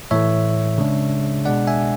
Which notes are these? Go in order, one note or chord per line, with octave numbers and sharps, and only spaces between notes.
A2 E3 A3 C#5 E5
C#3 G#3 D4
B2 G#3 D4 D5 F#5
E5 G#5